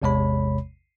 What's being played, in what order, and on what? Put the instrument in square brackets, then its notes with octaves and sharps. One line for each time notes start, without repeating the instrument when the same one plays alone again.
[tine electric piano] A1 E2 C3 G#3 C#5 B5